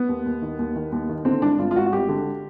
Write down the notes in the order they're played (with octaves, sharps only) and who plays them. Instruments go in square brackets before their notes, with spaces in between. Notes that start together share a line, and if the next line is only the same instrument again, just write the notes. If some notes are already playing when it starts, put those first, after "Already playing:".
Already playing: [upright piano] B3
D#2
D#2
D#3
D#2
D#3
D#2
D#3
D3 C4
G#1 D4
G#1 F4
F4
G#1 F#4
F#4
G#1 G4
D3